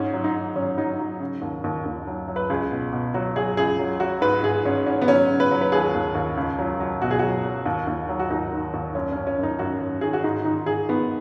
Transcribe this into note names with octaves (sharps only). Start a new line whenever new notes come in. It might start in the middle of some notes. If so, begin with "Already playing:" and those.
Already playing: G#2 C#4
F#3
D#4
G#2
F#3 C#4
F#3 D#4
F#3
C#3
D#2
D#2
D#2
F#3
F#3
B4
C#2 G#4
B2
B2
F#3 F#4
F#3 G#4
C#2 G#4
F#3
F#3 F#4
G#2 B4
G#2 G#4
G#2 C#4
G#2 C#4
B3
F#3 C#4
C#3
B4
F#3
B4
D#2 G#4
D#2
D#2
C#2
F#3
F#3
B2 F#4
G#4
F#3 F#4
F#3
D#2
D#2
F#3
F#4
D#2 D#4
D#3
D#2
F#2 C#4
F#2 C#4
C#4
F#2
D#4
F#2 F#4
F#2
D#3 G#4
F#4
G#2 D#4
D#3 D#4
G#2 G#4
D#3 B3